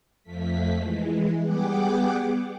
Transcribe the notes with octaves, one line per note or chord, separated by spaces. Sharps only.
F2 F3 A3 B6
E3 G#3
G3 B3 G#4 F#5 G5 D6